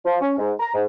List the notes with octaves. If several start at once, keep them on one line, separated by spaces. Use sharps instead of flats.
F3
C#4
G#2
A#5
G#2